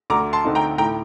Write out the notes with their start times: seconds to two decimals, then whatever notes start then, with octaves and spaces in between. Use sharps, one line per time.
0.10 D2 A#5 D6
0.33 A5 C6
0.45 D3 A3 C4 D#4
0.55 G5 A#5
0.78 A2 G5 A#5